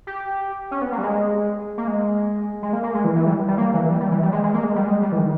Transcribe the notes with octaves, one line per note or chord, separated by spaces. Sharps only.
G4
C#4
B3
A#3
G3
G#3
A#3
G#3
G#3
A#3
A#3
G#3
E3
E3
G3
G3
A#3
E3
G3
G3
E3
G3
G#3
G#3
A#3
G#3
G3
G#3
G3
E3
D#3